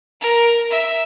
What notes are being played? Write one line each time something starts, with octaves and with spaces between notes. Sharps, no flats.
A#4
E5